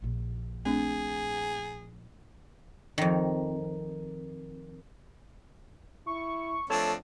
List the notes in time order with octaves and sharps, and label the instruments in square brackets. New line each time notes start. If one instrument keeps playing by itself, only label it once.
[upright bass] A#1 A#2
[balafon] A3 C4 D4 [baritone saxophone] G#4
[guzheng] F2 D#3
[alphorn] E4 [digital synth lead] C#6
[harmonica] F3 C4 D4 [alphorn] A3 [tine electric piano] A4 C#5 A5